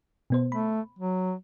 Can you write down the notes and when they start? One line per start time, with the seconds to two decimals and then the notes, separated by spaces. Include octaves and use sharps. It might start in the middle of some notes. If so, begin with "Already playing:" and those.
0.30 B2 B3 C5
0.52 A3 B5
0.99 F#3